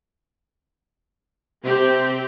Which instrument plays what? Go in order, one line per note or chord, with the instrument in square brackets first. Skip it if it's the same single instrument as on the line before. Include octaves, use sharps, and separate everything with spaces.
[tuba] C3 [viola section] C4 G4